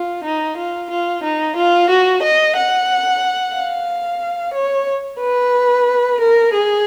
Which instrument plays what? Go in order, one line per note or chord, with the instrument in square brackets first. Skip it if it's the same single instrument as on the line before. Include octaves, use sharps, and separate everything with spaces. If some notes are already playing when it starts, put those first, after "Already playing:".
Already playing: [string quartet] F4
D#4
F4
F4
D#4
F4
F#4
D#5
F#5
F5
C#5
B4
A#4
G#4